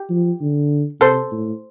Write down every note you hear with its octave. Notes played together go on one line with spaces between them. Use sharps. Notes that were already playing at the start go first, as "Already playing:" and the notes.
Already playing: G4
F3
D3
C3 A4 C5
A2